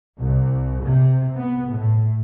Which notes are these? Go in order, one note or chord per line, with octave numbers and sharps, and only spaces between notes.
C2
C3
B3
A2